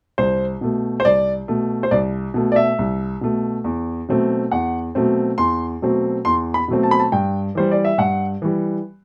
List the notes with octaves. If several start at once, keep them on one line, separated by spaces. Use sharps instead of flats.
C2 C5
B2 A3
C5
C2 D5
B2 A3
C5
C2 D5
B2 A3
D5
E5
C2
B2 A3
E2
B2 F#3 A3 C4
E2 F#5
B2 F#3 A3 C4
E2 C6
B2 F#3 A3 C4
E2 C6
B5
B2 F#3 A3 C4
A5
B5
A5
G2 G5
E3 G3 C5
D5
E5
G2 F#5
E3 G3